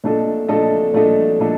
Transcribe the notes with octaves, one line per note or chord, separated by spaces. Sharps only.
A#2 A3 D4 A4 D#5
A#2 A3 D4 A4 D#5
A#2 A3 D4 A4 D#5
A#2 A3 D4 A4 D#5